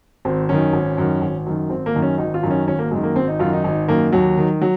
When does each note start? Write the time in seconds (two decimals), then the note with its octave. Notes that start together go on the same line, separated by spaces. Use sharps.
0.25 G#1 C4
0.49 F#2 D#3 C#4
0.73 G#1
0.98 F#2 D#3
1.21 G#1
1.46 F#2 D#3
1.70 G#1 C4
1.86 A#3
1.94 F#2 D#3
2.02 C#4
2.18 G#1 D#4
2.34 F4
2.43 F#2 D#3
2.51 C#4
2.68 G#1 C#4
2.79 A#3
2.91 F#2 G#3
2.96 D#3
3.03 A#3
3.16 G#1 C4
3.28 D#4
3.39 F#2 D#3 F4
3.53 D#4
3.64 G#1 D#4
3.88 F#2 D#3 A#3
4.12 D#2 F#3
4.37 D#3
4.61 F#3